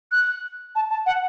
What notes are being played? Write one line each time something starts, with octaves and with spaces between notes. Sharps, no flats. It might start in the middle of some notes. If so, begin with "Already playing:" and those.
F#6
A5
A5
F#5